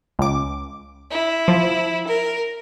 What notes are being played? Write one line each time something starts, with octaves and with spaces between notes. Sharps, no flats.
C#2 D6
E4
F3
A#4